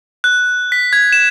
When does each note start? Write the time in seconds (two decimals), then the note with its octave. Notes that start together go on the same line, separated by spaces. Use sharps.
0.24 F#6
0.72 B6
0.93 G#6
1.13 E7